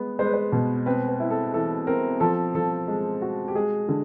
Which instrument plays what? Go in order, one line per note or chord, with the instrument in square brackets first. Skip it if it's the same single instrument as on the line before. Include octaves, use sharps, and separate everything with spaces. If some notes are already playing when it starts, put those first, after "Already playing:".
Already playing: [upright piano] G#3 B3
[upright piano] G#3 [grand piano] C5
[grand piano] B4
C5
[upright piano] B2
[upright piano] C4 [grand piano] B4
[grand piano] B4
[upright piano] E4
[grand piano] A4
[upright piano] E3 [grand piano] A4
[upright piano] C4 [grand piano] A#4
[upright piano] F3 [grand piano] A4
[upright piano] F3 [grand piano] A4
[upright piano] G#3
F#4
[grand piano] G4
[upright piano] G#3 [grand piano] G#4
[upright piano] D3